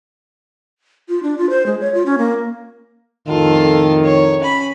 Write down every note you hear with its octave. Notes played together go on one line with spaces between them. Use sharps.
F4
D4
F4
C5
G#3
C#5
F4
C#4
A#3
F2 A2 D#3 F4 A4
C#5
C#4 B5